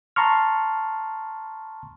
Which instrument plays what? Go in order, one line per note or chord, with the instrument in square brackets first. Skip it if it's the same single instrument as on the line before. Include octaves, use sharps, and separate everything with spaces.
[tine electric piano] A5 A#5 C6 C#6 F6